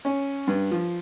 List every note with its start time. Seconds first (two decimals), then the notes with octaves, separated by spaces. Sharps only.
0.05 C#4
0.47 G2
0.71 F3